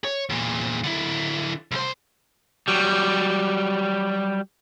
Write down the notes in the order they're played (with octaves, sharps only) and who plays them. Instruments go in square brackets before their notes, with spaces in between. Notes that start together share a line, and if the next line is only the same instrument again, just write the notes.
[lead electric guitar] C#5
E2 A#2
D3 E4
C2 C5
[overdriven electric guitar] F#3 G3